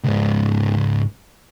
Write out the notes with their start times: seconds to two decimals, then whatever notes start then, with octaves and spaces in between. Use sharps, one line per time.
0.04 C#2 G#2